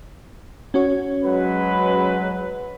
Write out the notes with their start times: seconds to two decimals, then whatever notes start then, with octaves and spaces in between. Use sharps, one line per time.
0.74 C#4 F#4 C#5
1.24 F#3 G#3 B4